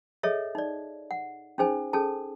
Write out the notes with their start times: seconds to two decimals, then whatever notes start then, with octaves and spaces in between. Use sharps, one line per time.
0.23 G#4 A4 C#5 D#5 E5
0.55 D#4 D5
1.11 F#5
1.58 C#4 D#4 G#4 C5 G#5
1.93 C#4 G#4 A4 A5